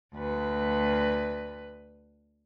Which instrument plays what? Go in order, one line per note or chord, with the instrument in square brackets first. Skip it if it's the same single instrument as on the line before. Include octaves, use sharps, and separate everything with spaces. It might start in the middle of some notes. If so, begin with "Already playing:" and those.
[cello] D2 B4